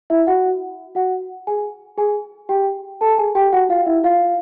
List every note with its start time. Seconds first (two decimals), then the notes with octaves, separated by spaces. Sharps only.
0.10 E4 E5
0.27 F#4 F#5
0.95 F#4 F#5
1.47 G#4 G#5
1.98 G#4 G#5
2.49 G4 G5
3.01 A4 A5
3.18 G#4 G#5
3.35 G4 G5
3.53 F#4 F#5
3.69 F4 F5
3.86 E4 E5
4.04 F4 F5